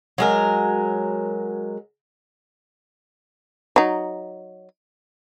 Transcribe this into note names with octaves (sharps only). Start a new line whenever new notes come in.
F#3 G#3 A#4
F#3 D#4